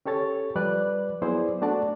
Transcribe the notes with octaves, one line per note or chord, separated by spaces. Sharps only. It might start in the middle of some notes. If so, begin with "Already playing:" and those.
C#4 G4 A4 C#5 A6
F3 G3 B4 D5 F#6
F#3 B3 E4 G#4 C5 D5
A3 D4 F#4 A4 D5 A5